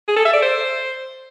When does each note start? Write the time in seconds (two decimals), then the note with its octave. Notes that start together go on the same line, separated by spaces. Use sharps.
0.08 G#4
0.16 A4
0.25 E5
0.34 D5
0.42 C5